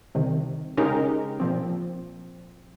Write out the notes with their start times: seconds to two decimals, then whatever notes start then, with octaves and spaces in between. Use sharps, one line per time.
0.15 C2 C3 D#3
0.77 C#3 G#3 D#4 G4 A#4
1.40 A#2 F3 C4